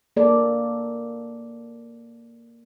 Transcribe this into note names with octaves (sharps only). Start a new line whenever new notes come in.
A#3 A4 D5